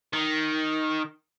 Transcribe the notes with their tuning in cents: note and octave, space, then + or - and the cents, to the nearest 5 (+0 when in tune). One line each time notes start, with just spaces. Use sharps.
D#3 +0